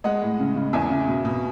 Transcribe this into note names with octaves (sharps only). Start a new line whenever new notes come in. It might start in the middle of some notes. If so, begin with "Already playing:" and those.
G#3 D#5 F#5
A2
C#3
C#3
E2 E5 G#5
C#3
B2
B2